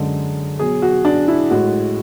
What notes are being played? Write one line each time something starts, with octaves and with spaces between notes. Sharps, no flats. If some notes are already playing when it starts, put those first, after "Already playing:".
Already playing: F#2 D3 G#3
B2 F#3 G#4
F#4
D4
E4
A2 G#3 F#4